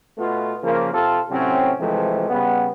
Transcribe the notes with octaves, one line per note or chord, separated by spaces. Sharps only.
B2 A3 B3 F4
C#3 F3 A#3
C3 F4 A4
A2 C3 F#3 C4 C#4
C3 E3 F3 G#3 A3
C#3 G3 B3